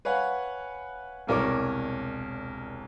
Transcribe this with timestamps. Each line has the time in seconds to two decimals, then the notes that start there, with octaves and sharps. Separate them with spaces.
0.05 B4 C#5 F5 F#5 G#5
1.27 E1 C2 A#4 C#5 D6